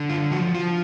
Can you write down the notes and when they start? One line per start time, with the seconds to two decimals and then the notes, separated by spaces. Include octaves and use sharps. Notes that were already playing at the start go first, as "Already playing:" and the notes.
Already playing: D3
0.09 F4
0.31 F3 F#4
0.54 F4